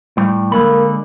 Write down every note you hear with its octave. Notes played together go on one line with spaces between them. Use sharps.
A2 G3
D3 G#3 A#3 B5